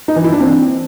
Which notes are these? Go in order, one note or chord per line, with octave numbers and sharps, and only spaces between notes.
D#4
E3
E4
D4
C4